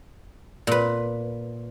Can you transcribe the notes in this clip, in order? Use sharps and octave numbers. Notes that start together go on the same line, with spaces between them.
A#2 B4